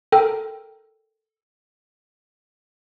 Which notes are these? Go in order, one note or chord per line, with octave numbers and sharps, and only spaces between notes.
A4 A#4 G5